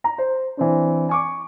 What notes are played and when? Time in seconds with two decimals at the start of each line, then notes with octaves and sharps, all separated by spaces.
0.04 A#5
0.18 C5
0.57 E3 C4 D4
1.09 G#5 C#6 D6